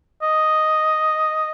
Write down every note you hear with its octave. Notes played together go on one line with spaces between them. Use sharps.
D#5